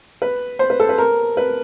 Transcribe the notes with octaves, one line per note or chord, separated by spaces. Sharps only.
B4
C5
B4
A4
B4
A#4
B4